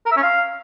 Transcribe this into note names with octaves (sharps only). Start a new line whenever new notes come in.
A#4
E5
C#4
F5